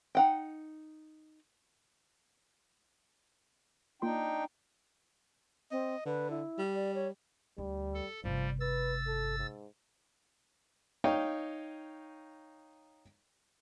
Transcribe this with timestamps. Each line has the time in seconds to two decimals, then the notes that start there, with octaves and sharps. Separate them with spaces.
0.15 D#4 F#5 G5
4.02 A#3 D4 D#4 F4 G5 C6
5.71 C4 D#5
6.06 D3 B4
6.30 E4
6.58 G3
6.75 D5
6.95 C#5
7.58 D2 G3
7.94 A4
8.24 G1 C3 F3 G3
8.60 B4 E6 A6
9.07 A4
9.38 G#2
11.04 D#4 C#5 D#5 F5 G5 C#6